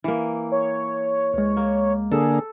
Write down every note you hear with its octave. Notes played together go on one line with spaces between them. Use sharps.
E3 A#3
C#5
C#2 G#3
A#3
D3 A#3 G#4 A4